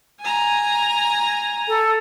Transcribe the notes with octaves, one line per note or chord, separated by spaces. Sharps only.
G#5 A#5
A4